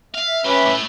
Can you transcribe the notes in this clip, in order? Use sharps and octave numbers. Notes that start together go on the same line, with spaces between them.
E5 F5
F#3 C#4 G4 B4
A2 A3